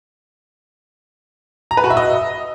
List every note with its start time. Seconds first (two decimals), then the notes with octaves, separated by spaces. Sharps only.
1.71 A#5
1.77 B4
1.84 F#4
1.90 E5
1.97 D#5